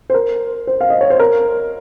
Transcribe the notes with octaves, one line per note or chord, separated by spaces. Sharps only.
C5
A#4
C5
F5
D#5
C#5
C5
A#4